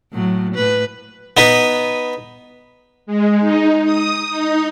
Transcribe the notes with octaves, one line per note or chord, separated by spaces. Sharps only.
A2 F#3
A2 B4
B3 D#4 B4
G#3
D#4
D#6
D#4